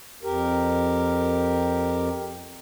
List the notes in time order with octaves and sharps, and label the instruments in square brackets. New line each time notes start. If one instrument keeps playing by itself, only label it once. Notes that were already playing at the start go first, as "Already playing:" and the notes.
[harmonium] F2 G4 A#4